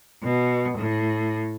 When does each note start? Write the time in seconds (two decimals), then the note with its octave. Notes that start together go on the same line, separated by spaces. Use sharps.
0.23 B2
0.77 A2